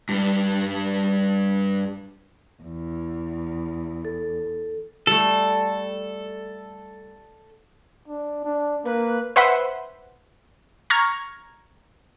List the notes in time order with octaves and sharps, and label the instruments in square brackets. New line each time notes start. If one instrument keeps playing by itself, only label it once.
[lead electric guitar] G2 G3
[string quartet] E2
[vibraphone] A4
[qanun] G3 A3 [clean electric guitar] A4
[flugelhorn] D4
D4
[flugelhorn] A#3 [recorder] B4
[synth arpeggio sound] B4 C5 E5 F#5 B5 C6
A#5 C#6 F6 G#6